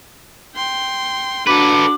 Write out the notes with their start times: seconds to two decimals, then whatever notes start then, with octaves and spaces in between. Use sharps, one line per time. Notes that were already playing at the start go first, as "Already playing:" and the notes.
0.55 G5 C6
1.47 D4 F#4 A4 B4 D6